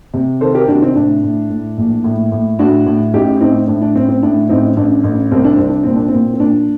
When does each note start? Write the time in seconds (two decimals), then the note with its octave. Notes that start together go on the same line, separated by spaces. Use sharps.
0.14 C3
0.41 D#3 A4 C5
0.55 G4 A#4
0.68 C3 D4 F#4
0.82 C4 D#4
0.95 A2 D4
1.23 A2
1.50 A2
1.77 A#1
2.04 A2
2.32 A2
2.59 A2 D4 F#4
2.86 A2
3.14 A1 D#4 G4
3.41 A2 C4 D#4
3.67 A2 D4
3.82 D4
3.95 A1 C4
4.09 C4
4.23 A2 D4
4.49 A1 C4 D#4
4.77 A1 D4
5.04 A1
5.32 C2 C4
5.44 D4
5.57 C2 C4
5.70 D4
5.83 A#2 C4
5.96 D4
6.08 C4
6.13 A#2
6.34 C4
6.40 A#2 D4